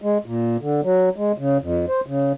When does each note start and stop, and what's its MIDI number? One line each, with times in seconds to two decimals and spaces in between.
0.02 0.18 56
0.26 0.57 46
0.61 0.81 50
0.84 1.09 54
1.16 1.32 56
1.38 1.58 49
1.62 1.86 41
1.88 2.01 72
2.07 2.32 49